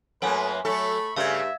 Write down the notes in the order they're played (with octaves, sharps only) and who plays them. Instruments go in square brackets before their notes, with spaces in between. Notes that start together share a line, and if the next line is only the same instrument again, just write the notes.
[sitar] F#2 A#3 [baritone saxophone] A3 [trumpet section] B4 [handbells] C#5 F#5 G#5
[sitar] F#3 A4 [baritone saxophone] A3 [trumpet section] E5 B5 C#6
[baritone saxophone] G2 [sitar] C#3 A3 [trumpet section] E5 [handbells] F5 G#6